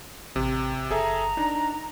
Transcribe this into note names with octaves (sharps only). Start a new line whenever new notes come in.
A1 C3
F#1 G#4 A4 E5 A#5
D4 D#4